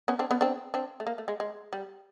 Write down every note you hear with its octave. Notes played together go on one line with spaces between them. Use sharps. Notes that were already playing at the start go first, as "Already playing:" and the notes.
B3 C#4
C4 D4
B3 C#4
C4 D4
C4 D4
A3
A#3
A3
G#3
G#3
G3